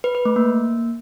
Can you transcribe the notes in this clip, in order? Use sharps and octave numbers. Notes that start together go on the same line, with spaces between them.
B4
B4
A3
A#3